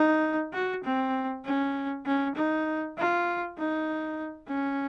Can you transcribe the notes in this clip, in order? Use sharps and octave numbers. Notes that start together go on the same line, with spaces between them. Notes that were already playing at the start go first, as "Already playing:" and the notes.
Already playing: D#4
F#4
C4
C#4
C#4
D#4
F4
D#4
C#4